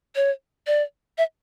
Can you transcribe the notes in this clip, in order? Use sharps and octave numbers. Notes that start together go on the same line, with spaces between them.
C#5
D5
E5